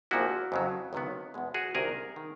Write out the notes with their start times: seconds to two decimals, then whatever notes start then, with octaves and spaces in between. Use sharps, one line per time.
0.11 A#1 A#2 F3 A#3 E4 F#4
0.52 F2 C#3 F#3
0.93 C#2 C3 D#3 F#3 B3
1.34 E2 B2 G#3
1.54 F#4 G#4
1.75 C2 C3 D#3 G#4 A#4
2.16 D#3